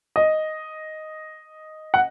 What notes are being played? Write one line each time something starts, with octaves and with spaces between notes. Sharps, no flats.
D#5
F#5